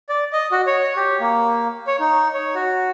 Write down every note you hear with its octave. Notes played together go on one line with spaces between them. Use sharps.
D5
D#5
F#4
C#5
G4
A#3
C#5
D#4
C#5
F#4